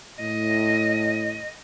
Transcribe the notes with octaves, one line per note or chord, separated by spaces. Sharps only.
A2 D#5